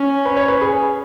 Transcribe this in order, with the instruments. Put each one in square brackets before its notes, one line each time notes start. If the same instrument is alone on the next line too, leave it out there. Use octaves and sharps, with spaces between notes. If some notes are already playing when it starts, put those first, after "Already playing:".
Already playing: [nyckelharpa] C#4
[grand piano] B4
C#5
B4
G#4